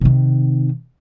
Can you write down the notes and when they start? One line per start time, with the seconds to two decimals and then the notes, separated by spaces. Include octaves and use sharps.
0.01 C3 D#3